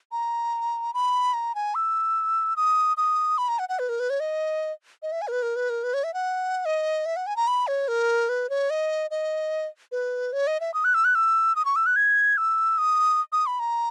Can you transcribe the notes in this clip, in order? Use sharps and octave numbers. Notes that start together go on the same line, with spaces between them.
A#5
B5
A#5
G#5
E6
D#6
D#6
B5
A#5
F#5
F#5
B4
A#4
B4
C#5
D#5
D#5
E5
G#5
A#4
B4
A#4
B4
A#4
B4
C#5
E5
F#5
D#5
E5
F#5
G#5
A#5
B5
C#5
A#4
B4
C#5
D#5
D#5
B4
C#5
D#5
E5
D#6
F#6
E6
F#6
E6
D#6
C#6
E6
F#6
G#6
E6
D#6
D#6
B5
A#5